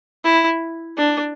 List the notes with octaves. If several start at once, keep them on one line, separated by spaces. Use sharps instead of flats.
E4
D4